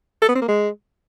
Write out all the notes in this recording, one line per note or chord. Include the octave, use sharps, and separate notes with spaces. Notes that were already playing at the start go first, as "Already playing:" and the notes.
A4
B3
C4
A#3
G#3